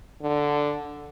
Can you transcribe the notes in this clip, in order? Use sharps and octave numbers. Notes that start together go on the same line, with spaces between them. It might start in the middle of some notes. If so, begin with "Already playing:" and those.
D3